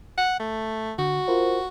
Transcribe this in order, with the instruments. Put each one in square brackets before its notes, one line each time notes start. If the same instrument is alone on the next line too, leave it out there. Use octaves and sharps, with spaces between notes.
[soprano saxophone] F#5
A3
[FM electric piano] D3 [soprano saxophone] F#4
[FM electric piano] F4 A#4 C5